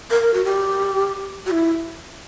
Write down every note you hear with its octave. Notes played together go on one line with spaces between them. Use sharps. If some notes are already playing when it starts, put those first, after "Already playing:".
A#4
F#4
G4
F#4
E4